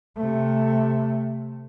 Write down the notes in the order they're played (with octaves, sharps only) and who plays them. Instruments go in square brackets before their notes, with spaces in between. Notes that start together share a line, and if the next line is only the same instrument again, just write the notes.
[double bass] C3 A3